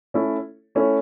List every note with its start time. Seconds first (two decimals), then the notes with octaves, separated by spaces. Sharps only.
0.14 A3 C#4 E4 A4 C#5
0.75 A3 C#4 E4 A4 C#5